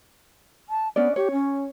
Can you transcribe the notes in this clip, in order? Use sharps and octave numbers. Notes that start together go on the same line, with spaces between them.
A5
B3 C#4 D4 D5
G4 C#5
C#4